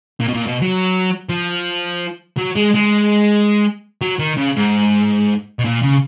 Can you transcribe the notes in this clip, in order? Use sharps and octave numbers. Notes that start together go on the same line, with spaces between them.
A#2
B2
A#2
B2
F#3
F3
F#3
G#3
G#3
F#3
D#3
C#3
G#2
B2
A#2
C#3